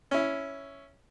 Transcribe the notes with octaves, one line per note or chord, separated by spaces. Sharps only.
C#4 E4